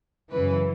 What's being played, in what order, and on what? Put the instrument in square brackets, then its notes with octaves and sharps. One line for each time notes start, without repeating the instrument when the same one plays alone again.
[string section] F#2 C#3 E3 B4